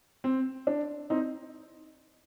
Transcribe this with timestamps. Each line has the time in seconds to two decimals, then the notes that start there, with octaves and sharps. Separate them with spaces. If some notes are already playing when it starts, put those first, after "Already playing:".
0.24 C4
0.67 D4
1.10 C4 D#4